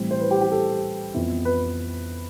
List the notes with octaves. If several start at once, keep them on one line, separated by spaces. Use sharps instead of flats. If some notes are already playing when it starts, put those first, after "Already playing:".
Already playing: A2 E3 G3 C4
C5
B4
G4
G4
A4
F2 E3 B3 E4
B4